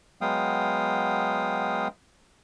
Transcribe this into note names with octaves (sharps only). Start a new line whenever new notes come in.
F#3 G#3 B3 F5 G5 D#6